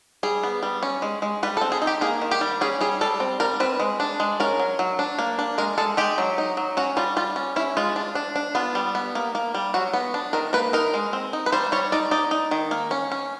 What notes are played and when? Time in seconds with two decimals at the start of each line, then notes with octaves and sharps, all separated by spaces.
0.23 G3 G#4
0.43 B3
0.63 G3
0.83 C#4
1.02 G#3
1.22 G#3
1.43 G3 B4
1.57 A4
1.61 C4
1.72 G#4
1.82 D#4
1.87 G4
2.01 A#3 G#4
2.22 D#3
2.31 G4
2.41 G3
2.61 C#4 G#4
2.81 G3 G#4
3.01 G3 A4
3.20 C4
3.40 G3 A#4
3.60 C4 B4
3.79 G#3
4.00 D4
4.20 G#3
4.40 C#4 A#4
4.59 F#3
4.79 F#3
4.99 D4
5.18 A#3
5.39 D4
5.58 G#3 A#4
5.78 G#3 A4
5.97 G#3 G4
6.18 F#3
6.38 D#4
6.57 F#3
6.77 C#4 F#4
6.97 G3 F4
7.17 G3 F4
7.36 C#4
7.56 C#4 E4
7.77 G#3 F4
7.96 D4
8.15 D4
8.36 D4
8.55 B3 F4
8.75 G3
8.95 B3
9.15 A#3
9.35 A#3
9.54 G3
9.74 F#3 F#4
9.93 B3
10.14 D4
10.33 D#3 A#4
10.53 A#3 B4
10.73 D#4 A#4
10.94 G#3
11.13 C4
11.33 D#4
11.46 B4
11.52 G3 C5
11.72 G3 C#5
11.92 D#4 D5
12.11 D#4 D5
12.31 D#4
12.51 D#3
12.71 A#3
12.91 C#4
13.12 C#4